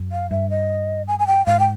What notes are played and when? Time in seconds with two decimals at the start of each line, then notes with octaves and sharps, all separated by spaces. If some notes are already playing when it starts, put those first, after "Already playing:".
Already playing: F#2
0.12 F5
0.31 G2 E5
0.50 D#5
1.08 G#5
1.19 G#5
1.27 G5
1.46 G#2 F5
1.60 G5